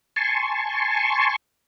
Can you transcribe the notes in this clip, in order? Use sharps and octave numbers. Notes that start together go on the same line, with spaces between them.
G#5 A5 C6 C#6